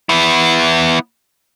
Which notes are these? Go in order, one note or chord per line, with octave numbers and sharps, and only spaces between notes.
B3 E4